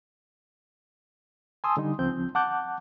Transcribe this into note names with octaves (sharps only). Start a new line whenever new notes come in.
G#5 A5 C6 D#6 E6
D3 G3 D#4
C#2 F3 C4 G6
F#5 A5 D6 F#6 G6